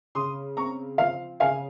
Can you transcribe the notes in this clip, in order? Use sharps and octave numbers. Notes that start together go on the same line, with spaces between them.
C#3 C6 D#6
C4 A#5 C#6
F3 F5
C#3 F5 G#5